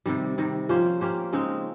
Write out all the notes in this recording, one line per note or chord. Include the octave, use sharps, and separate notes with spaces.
C3 D#3 G3
C3 D#3 G3
F3 A#3 C#4 G4 C5
A#3 C#4 G4 C5
C#3 G#3 C4 D#4